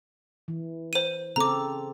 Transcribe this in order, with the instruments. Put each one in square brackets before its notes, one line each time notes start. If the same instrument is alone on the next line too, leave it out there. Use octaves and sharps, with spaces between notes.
[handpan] E3
[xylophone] C5 D#7
[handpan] C#3 C4 A4 [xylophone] A#5 D6